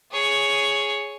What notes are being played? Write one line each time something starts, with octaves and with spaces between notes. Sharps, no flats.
G#4 C#5